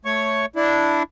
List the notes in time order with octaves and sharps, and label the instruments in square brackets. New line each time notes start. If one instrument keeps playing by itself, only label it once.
[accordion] A3 C#5 C#6
D4 E4